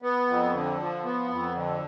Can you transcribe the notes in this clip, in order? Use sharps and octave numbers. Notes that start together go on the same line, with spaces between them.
B3
F2
D3
F3
B3
F2
D3